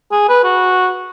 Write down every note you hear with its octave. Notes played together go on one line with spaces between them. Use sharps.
G#4
B4
F#4